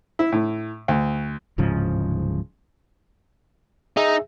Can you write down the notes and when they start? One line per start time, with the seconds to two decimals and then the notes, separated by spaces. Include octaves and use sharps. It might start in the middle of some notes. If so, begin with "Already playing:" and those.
0.19 E4
0.32 A2
0.88 D2
1.58 D1 G#2 C#3 F3
3.97 D#4 G#4 E5